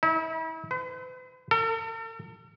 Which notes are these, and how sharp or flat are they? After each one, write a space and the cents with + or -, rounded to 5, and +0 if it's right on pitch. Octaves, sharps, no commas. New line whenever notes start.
E4 -40
B4 +45
A4 +45